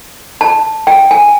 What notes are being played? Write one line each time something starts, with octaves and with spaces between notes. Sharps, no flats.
A5
G5
G#5